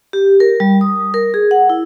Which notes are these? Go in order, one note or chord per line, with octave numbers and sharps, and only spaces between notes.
G4
A#4
G3
D#6
A#4
G#4
F#5
E4